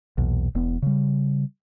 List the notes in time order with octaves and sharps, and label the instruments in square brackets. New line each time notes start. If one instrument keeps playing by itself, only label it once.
[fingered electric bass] B1 E2 A#2
E1 E2 B3
C#3 G3